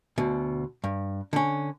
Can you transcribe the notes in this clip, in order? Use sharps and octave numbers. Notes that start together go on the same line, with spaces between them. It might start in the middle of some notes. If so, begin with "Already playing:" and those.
D2 B2
G2
D3 C#4